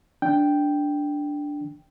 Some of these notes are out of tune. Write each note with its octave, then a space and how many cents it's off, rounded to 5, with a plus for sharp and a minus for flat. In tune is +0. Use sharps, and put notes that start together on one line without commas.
D4 -5 G5 +0